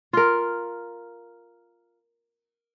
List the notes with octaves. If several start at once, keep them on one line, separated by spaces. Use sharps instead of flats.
F4 A#4